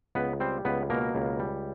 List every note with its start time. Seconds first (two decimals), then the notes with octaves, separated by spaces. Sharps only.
0.15 C#2 B3 B4
0.40 G3 C4 C5
0.65 C#2 B3 B4
0.90 B2 A#3 A#4
1.15 C#2
1.39 G3